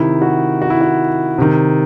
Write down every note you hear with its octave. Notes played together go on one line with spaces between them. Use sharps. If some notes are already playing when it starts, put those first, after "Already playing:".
Already playing: C3 D#3 E4
F#4
F#4
E4
F#4
C3 D#3